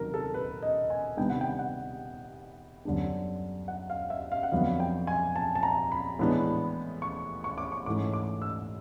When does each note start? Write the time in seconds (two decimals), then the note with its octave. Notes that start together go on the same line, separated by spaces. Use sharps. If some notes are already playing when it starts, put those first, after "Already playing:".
Already playing: C3 D#3 F#3 A#4
0.14 A4
0.34 B4
0.63 D#5
0.90 G#5
1.17 C3 D#3 G3 B3 D4 G5
1.30 F#5
1.41 G5
1.59 F#5
2.85 F#2 D3 G3 B3 D4
3.68 F#5
3.90 F5
4.10 E5
4.32 F5
4.43 F#5
4.52 F2 D3 F#3 B3 F5
4.80 G5
5.07 G#5
5.36 A5
5.55 A5
5.63 A#5
5.92 B5
6.19 A2 E3 G#3 B3 D4
7.02 C#6
7.44 C#6
7.58 D6
7.72 C#6
7.86 G#2 E3 A3 C#4 D6
8.13 D6
8.42 E6